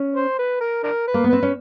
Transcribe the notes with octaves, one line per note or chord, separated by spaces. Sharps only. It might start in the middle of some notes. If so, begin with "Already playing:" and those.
Already playing: C#4
C5
B4
A#4
D4 A#4
B4
A#3
B3
C4 B4
C#4